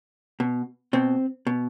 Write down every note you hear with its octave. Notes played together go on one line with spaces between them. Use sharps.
B2
B2 C4
B2